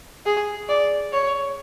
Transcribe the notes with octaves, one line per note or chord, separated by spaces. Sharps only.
G#4
D5
C#5